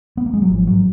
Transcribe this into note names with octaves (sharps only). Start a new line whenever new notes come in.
B3
A#3
G#3
F#3
G#1 F3
G#2 F#3